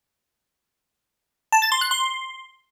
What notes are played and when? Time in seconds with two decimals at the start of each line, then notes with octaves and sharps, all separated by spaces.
1.52 A5
1.62 A6
1.72 C6
1.81 F#6
1.91 C6